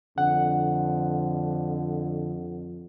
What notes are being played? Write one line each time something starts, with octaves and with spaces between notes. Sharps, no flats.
F2 D3 F#5